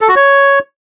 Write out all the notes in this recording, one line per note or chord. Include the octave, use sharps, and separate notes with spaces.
A4
F#4
C#5